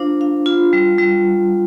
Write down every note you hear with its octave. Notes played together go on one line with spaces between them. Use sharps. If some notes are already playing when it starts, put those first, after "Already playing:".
Already playing: D4 F4 C5 F5
F5
F4
G3
G3